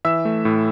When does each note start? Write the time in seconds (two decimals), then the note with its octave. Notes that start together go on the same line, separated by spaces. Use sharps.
0.05 E3 E5 E6
0.25 A3
0.45 A2